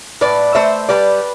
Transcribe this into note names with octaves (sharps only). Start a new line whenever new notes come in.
A2 B4 D5
A3 C5 E5
G3 B4 D5